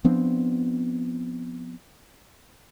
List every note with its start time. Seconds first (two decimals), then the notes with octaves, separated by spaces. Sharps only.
0.04 F3 B3 C4 D4